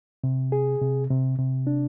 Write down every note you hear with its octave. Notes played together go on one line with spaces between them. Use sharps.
C3
G#4
C3
C3
C3
D4